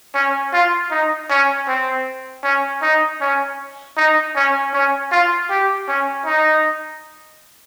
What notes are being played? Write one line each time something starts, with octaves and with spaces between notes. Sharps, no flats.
C#4
F4
D#4
C#4
C4
C#4
D#4
C#4
D#4
C#4
C#4
F4
G4
C#4
D#4